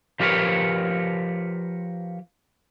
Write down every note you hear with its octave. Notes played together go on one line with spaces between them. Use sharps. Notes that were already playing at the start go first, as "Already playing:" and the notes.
F3 G4 A#4 B4 C#5